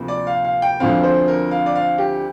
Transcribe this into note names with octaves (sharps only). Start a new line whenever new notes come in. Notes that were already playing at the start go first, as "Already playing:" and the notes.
Already playing: D2 C3 F3 A#3
D5
F5
F5
G5
D2 D3 F3 C4 F5
C5
A#4
F5
D5
F5
G4